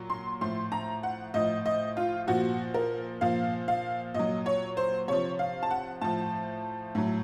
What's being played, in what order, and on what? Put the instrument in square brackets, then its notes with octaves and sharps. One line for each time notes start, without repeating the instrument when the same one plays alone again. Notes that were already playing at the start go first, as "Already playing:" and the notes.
Already playing: [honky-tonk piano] A#2 F#3
C6
A2 F3 C6
A#5
F#5
A2 F3 D#5
D#5
F4
A#2 F3 F#4
A#4
A#2 F3 F5
F5
A#2 F#3 D#5
C#5
C5
C3 F3 C#5
F5
A5
F#5
A2 F3 A5
A2 F#3